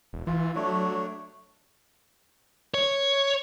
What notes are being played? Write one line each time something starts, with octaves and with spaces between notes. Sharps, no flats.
E1
E3 F4
F#3 A3 D4 C#5
C#5